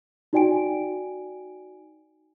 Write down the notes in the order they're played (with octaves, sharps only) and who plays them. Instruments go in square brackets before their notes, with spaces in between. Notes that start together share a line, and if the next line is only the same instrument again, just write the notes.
[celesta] D#4 F#4 D5 G5 G#5 D7